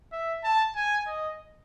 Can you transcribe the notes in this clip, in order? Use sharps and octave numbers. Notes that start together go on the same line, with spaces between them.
E5
A5
G#5
D#5